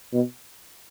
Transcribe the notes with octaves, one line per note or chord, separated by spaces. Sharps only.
B2